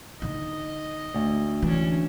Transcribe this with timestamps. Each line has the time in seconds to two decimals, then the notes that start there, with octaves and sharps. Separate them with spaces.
0.22 D3 D#4 D#5
1.14 D2
1.62 E3 G#3 C#4 D4